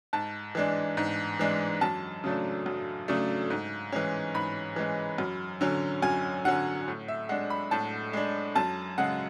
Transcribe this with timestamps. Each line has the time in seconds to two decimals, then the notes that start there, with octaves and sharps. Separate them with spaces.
0.13 G#2 A5
0.55 E3 G#3 D4
0.97 G#2
1.39 E3 G#3 D4
1.81 F#2 A5
2.24 C#3 F#3 A3 D4
2.66 F#2
3.08 C#3 F#3 A3 D4
3.50 G#2
3.92 E3 G#3 C#4
4.34 G#2 B5
4.76 E3 G#3 C#4
5.18 F#2
5.61 D3 F#3 C#4
6.02 F#2 G#5
6.45 D3 F#3 C#4 F#5
6.88 A2
7.08 E5
7.29 G#3 D4 F#5
7.50 B5
7.71 A2 A5
8.13 G#3 D4
8.55 F#2 A5
8.98 C#3 G#3 F#5